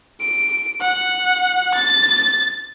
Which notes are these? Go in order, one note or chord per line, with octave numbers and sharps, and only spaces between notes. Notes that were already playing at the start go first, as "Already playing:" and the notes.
D7
F#5
A6